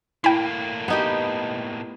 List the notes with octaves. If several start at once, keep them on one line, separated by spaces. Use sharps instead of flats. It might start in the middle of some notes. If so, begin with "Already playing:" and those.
A2 A#3 E4 G5 G#5 B5
B3 D#4 G4